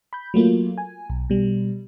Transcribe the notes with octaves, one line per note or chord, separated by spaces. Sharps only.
B5 G6
F#3 A3 A#3 F4
G#5
B1
B2 G3